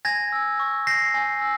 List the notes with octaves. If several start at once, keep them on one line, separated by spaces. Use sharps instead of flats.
G#5 G#6 A#6
E6
C#6
G6 A#6 C7
G#5
E6